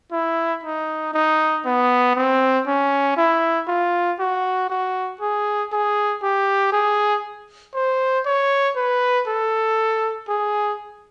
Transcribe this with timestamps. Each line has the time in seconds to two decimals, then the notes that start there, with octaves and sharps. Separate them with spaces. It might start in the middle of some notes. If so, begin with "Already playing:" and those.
0.12 E4
0.64 D#4
1.14 D#4
1.65 B3
2.15 C4
2.67 C#4
3.17 E4
3.67 F4
4.19 F#4
4.69 F#4
5.20 G#4
5.72 G#4
6.23 G4
6.72 G#4
7.74 C5
8.25 C#5
8.76 B4
9.27 A4
10.28 G#4